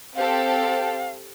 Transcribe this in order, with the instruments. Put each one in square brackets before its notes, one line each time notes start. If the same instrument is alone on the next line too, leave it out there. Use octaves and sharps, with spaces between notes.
[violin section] C4 G4 A4 [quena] F5